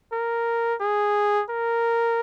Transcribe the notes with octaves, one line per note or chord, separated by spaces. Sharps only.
A#4
G#4
A#4